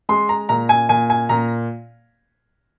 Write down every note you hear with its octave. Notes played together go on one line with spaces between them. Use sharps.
G#3 C6
A#5
A#2 A#5
G#5
A#2 G#5
G#5
A#2 A#5